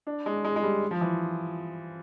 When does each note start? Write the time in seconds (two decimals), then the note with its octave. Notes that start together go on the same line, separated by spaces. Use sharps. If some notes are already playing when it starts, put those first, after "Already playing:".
0.07 D4
0.26 G#3
0.44 G#3
0.56 G#3
0.63 G3
0.91 F3
1.01 E3